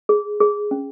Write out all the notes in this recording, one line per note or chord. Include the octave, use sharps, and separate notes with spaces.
G#4
G#4
C#4